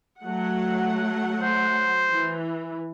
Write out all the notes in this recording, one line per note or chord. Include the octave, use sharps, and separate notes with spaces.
F#3 A3 F#5
C5
E3